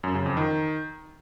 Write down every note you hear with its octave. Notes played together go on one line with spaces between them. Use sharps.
F#2
C#3
F2
D#3